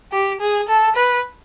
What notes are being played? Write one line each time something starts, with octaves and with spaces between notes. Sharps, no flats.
G4
G#4
A4
B4